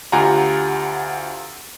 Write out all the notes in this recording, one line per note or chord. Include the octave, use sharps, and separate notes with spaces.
D2 F4 G4 F#5 G#5 A#5